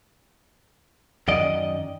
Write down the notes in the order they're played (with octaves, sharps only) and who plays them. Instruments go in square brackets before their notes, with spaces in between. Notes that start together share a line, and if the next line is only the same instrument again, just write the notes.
[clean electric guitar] F#2 D#3 D5 D#5